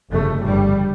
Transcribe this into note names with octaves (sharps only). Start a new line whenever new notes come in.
G1 F2 C#3 A3
G1 G2 G3